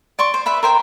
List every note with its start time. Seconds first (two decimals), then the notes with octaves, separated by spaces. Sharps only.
0.19 D5 C6 C#6
0.34 C5
0.46 B4 E5 B5
0.63 A#4 C5 G5